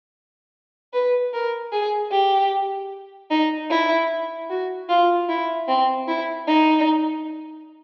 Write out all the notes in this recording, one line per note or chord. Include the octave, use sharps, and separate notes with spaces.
B4
A#4
G#4
G4
D#4
E4
F#4
F4
E4
C4
E4
D#4